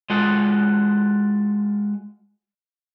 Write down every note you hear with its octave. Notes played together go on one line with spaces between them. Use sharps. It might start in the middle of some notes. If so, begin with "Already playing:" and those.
G#3 F4 F#4 A4